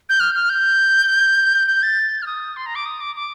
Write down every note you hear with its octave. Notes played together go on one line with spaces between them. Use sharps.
G6
F6
F6
G6
G6
A6
F6
D#6
C6
A#5
D6
D#6
D6
D6